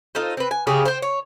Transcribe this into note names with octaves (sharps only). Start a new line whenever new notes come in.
D#4 F4 A4 C5
C4 B4
G#5
C#3 G4 G#4
C5 G5
C#5